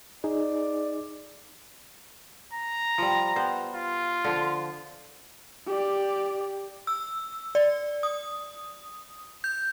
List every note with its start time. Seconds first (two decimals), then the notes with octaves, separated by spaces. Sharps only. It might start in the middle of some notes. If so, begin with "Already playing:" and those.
0.24 D#4 G#4 D5
2.53 A#5
2.98 F3 G3
3.36 G3 B3 C5
3.75 F4
4.24 D3 F3
5.66 G4 D5
6.87 E6
7.55 D5
8.03 D#6
9.44 G6